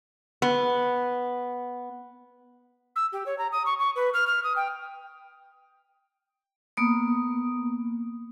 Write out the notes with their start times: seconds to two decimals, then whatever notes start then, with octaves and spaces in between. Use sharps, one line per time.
0.42 B3
2.96 E6
3.12 G4
3.26 C#5
3.38 A#5
3.52 D#6
3.66 C#6
3.79 C#6
3.96 B4
4.14 F6
4.27 F6
4.44 D#6
4.56 G5
6.77 A#3 B3 D#6